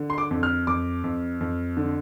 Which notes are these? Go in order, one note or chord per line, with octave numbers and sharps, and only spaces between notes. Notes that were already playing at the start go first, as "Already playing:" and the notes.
Already playing: D3
C6
D6
F2
F6
F2 D6
F2
F2
D3